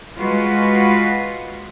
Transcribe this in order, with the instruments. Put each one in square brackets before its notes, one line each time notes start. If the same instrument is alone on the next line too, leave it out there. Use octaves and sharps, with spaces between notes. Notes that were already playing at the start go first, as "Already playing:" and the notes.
[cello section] G#3 F4 F#4 B4